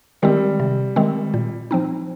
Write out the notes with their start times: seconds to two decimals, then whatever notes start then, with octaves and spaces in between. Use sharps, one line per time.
0.22 D#3 G3 G#3 C4
0.60 C3
0.96 D#3 G#3 C4
1.34 A#2
1.71 F3 C4 D#4